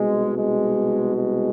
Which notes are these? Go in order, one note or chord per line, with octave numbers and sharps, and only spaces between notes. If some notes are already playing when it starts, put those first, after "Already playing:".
Already playing: C2 B2 G#3
G#3
G#3